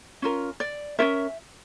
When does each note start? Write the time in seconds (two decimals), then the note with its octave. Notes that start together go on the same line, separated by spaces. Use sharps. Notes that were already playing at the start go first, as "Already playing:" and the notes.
0.22 C#4 F4 A#4
0.60 D5
0.99 C#4 F4 A#4 E5